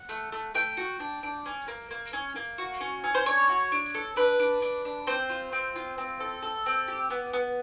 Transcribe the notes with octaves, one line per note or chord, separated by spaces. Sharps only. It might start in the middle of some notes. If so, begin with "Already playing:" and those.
Already playing: F#5
A3
A3
A3 G5
F#4
D4
D4
C#4
A#3
A#3
C#4
A#3
F#4
C#4
C#4
C5
D4 C#5
F#4
D4
A4
D4 B4
D4
D4
D4
C4 C5
F4
C4
F4
C4
A4
A4
C4
G4
B3
B3